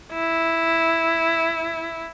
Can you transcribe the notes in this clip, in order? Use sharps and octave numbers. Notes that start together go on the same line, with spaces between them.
E4